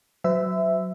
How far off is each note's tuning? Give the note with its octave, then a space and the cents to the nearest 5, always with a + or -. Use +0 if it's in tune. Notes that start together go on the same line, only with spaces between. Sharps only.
F#3 +0 C5 -45 E5 +0